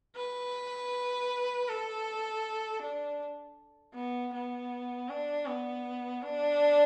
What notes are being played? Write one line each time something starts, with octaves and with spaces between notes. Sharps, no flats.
B4
A4
D4
B3
B3
D4
B3
D4